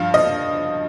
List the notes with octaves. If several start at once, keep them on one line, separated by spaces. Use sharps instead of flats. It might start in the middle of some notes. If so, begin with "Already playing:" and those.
Already playing: G2 F3 F5
D#5